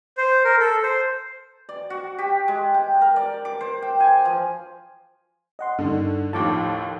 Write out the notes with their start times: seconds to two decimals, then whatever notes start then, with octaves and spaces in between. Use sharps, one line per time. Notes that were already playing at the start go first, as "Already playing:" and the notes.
0.17 C5
0.44 A#4
0.59 A4
0.83 C5
1.69 D5
1.90 F#4
2.18 G4
2.48 G#3
2.74 G5
3.01 A#4
3.16 D5
3.45 D6
3.61 C5
3.82 G5
4.00 G#5
4.25 F3
5.59 D#5 F#5 C6
5.79 G2 D3 D#3
6.33 D#2 A2 F3 A5 D6